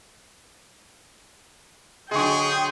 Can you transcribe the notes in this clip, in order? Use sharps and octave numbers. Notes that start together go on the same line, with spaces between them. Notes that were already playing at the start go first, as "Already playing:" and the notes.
D3 F#3 G#3 D4 G#4 G5 C#6